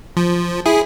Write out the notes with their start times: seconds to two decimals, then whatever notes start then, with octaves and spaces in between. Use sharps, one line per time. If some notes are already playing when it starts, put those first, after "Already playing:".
0.17 F3
0.66 E4 G#4